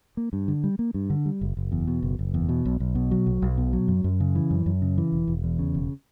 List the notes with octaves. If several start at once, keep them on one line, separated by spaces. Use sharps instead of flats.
A#3
G2
D3
G3
A#3
G2
D3
G3
F#1
F#1
E2
B2
F#1
F#1
E2
B2
B1
B1
B2
F#3
B1
B1
B2
F#3
F#2
F#2
C#3
E3
F#2
F#2
C#3
E3
E1
E1
E2
C#3
E1